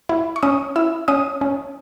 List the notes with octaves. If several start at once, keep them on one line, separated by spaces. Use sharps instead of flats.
E4
C#6
C#4 D#6
E4 E6
C#4 D#6
C#4